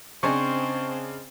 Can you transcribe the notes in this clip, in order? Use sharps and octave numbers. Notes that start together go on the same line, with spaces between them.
C#3 C4 D4 C5 D#5 G#5 C#6